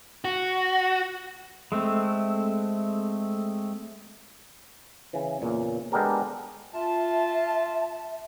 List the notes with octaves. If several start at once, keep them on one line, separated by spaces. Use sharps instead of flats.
F#4
G#3 A3 C4
C#3 E3
E2 A#2 C#3
G#3 B3 D4 G4 A4 A#4
F4 E5 A5